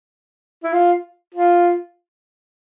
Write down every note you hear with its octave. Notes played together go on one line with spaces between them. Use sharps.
E4
F4
F4